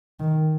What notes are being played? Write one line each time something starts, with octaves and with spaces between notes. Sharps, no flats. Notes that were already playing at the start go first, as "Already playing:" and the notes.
D#3